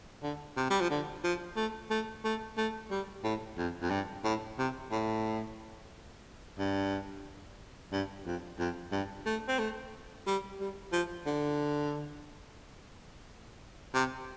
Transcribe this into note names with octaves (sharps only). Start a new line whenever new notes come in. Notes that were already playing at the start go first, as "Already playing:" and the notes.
D3
C3
G3
F3
D3
F3
A3
A3
A3
A3
G3
A2
F2
F2
G2
A2
C3
A2
G2
G2
F2
F2
G2
A3
C4
A3
G3
G3
F3
D3
C3